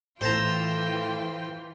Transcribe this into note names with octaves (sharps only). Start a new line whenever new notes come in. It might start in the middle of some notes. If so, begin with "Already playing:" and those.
A2 E3 A3 F4 C5 G5 A5 A#5